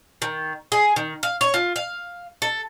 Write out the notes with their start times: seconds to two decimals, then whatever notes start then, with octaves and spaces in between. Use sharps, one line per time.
0.22 D#3
0.72 G#4
0.96 D#3
1.23 F5
1.41 C#5
1.54 F4
1.76 F5
2.42 A4